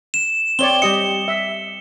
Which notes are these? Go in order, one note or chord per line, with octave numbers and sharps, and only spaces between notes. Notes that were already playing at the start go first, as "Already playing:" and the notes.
E7
C4 C#5 D5 G7
G3 G4 D#5 C#7
E5